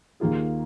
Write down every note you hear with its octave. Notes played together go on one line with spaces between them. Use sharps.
D#2 D#3 A#3 F4 G#4